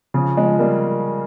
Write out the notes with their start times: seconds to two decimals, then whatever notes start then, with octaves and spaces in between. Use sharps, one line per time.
0.14 C#3 F3
0.37 F3 G#3
0.59 G3 A#3